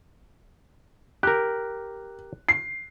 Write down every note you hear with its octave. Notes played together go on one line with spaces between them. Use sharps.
G4 A#4 F#6
C7